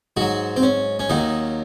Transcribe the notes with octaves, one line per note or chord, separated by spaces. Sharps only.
G#2 F#3 F#4
C4
C#4
C#4
D#2 D#3 F#3 D#4